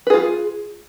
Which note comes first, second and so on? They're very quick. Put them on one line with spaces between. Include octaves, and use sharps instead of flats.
B4 G#4 F4